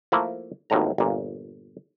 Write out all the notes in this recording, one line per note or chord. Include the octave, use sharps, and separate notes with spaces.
F3 A3 A#3 E4
G#1 D#2 A2 D3 A#5
G1 A#2